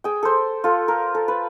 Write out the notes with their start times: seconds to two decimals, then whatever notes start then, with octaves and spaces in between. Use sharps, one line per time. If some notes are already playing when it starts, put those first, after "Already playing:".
0.04 G#4 G5
0.23 A4 C5
0.64 F4 A4
0.88 A#4
1.15 A4
1.28 B4